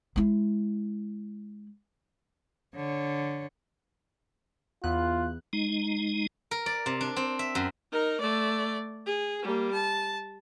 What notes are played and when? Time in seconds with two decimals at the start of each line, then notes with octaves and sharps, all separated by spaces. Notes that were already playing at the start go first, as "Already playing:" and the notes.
0.16 G#3 E4
2.75 D3 C#5
4.84 E2 B3 F4 F#6
5.53 G#3 D#4
6.51 A#4
6.66 D5
6.86 C3
7.01 D4
7.16 C4
7.39 E5
7.55 F#2
7.92 D#4 A#4
8.21 A3 D5
9.06 G#4
9.42 G3 A#3
9.73 A5